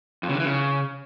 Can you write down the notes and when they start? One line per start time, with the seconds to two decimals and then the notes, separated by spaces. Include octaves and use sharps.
0.23 F2
0.29 C#3
0.34 D3
0.40 E3
0.45 C#3